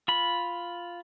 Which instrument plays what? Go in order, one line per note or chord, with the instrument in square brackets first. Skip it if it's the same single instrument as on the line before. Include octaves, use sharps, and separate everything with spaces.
[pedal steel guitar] F4 B5